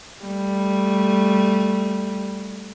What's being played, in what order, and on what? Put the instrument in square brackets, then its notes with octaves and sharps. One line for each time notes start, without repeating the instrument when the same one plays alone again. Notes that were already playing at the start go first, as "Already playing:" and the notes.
[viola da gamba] G3 A3